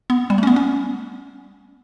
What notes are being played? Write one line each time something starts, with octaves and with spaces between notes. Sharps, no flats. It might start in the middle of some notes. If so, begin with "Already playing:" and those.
B3
G3
A3
C#4
B3
C#4